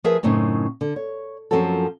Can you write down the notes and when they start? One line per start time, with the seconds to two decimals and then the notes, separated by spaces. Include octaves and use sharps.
0.04 F3 G#4 A#4 B4 E5
0.23 F#2 A2 C#3 C4 D#4
0.81 D3
0.96 C#5
1.51 F#2 F3 C4 C#4 F#4 A4